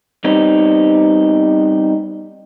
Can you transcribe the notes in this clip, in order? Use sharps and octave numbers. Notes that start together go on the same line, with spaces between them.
G3 B3 C4 D#4